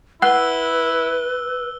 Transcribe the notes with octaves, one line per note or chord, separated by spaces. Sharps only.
E4 B4 F#5 E6 F#6 G7